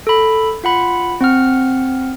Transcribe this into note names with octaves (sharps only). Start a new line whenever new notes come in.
A4 B5
F4 F#5 B5
C4 F#5 F6